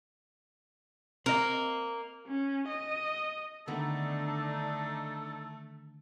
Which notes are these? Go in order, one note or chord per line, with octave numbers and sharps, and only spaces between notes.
A#3 C4 D#5
C#4
D#5
D3 D#3 A3 B3 D4 D#4 A4